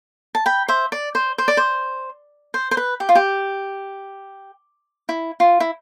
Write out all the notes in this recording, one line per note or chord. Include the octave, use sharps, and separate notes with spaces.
A5
G5 B5
C5 E5
D5
C5
C5
D5
C5
C5
C5
B4
G4
F4
G4
E4
F4
E4